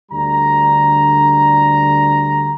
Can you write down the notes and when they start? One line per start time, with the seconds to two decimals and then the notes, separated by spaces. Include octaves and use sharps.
0.12 D2 D3 G3 D4 A#5